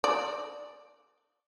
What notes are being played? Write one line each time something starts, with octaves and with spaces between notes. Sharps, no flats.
D5